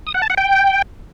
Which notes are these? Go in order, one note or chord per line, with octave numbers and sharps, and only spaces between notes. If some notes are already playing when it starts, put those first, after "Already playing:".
D#6
F#5
A5
F#5
G5